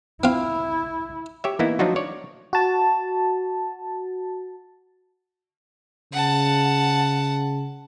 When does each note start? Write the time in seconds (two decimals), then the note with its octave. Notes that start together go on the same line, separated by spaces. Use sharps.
0.24 C4 E4 F4
1.44 G4 C#5 E5
1.59 E3 A#3 B3 D#4 E4
1.79 F3 F#3 D4 D#4 F4 F#4
1.96 C#5 D5
2.53 F#4 A5
6.13 C#3 F#5 A5